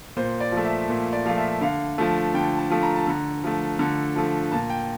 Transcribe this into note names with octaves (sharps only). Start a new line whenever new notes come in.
A#2 C5
D5
F3 A3
E5
A#2
D5
F3 A3 F5
E5
D3 F5
F3 A3
D3 G5
A5
F3 A3
A#5
A5
D3 A#5
F3 A3
D3
F3 A3
A#2 A5
G5